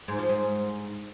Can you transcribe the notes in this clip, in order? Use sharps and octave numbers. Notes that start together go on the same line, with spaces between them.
G#2
F3
G#2